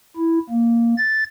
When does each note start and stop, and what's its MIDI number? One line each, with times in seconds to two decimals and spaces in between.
0.17 0.39 64
0.50 0.94 58
0.97 1.23 93